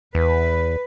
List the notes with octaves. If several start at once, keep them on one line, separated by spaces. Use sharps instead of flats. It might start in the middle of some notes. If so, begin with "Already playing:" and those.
E2 B4